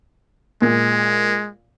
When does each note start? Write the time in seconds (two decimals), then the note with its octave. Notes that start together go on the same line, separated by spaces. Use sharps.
0.62 A#2 G#3